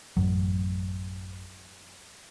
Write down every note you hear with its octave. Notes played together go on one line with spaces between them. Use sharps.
A1 F#2 F#3